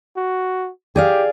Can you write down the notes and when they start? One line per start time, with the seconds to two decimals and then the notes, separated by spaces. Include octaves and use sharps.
0.17 F#4
0.96 G4 G#4 D5 F5